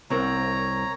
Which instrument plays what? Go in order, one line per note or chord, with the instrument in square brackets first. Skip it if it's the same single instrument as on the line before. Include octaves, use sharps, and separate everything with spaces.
[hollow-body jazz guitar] C2 C4 A#4 [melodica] C#5 A#5